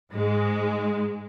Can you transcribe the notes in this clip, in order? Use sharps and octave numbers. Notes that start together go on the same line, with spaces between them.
G#2 G#3